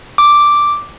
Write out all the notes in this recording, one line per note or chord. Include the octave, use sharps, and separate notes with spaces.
D6